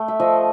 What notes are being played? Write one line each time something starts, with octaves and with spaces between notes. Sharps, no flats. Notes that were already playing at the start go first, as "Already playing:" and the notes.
Already playing: A3 G5
E5
F3 D#5